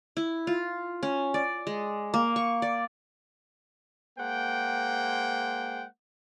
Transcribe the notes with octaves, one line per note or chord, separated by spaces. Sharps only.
E4
F4
C#4
D5
G#3
A#3
C#6
D5
G#3 A#3 C5 F#5 G5